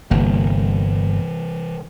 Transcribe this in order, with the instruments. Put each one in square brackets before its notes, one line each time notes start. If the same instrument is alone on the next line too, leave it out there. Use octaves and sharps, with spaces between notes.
[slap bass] G1 [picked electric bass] C3 E3 A#3